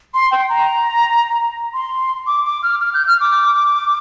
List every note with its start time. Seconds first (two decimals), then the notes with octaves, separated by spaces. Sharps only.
0.14 C6
0.31 G5
0.49 A#5
1.74 C6
2.27 D6
2.45 D6
2.63 F6
2.80 F6
2.94 G6
3.07 F6
3.21 D6